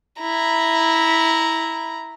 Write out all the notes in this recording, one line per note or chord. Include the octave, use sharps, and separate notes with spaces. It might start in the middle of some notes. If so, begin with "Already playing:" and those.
E4 A#5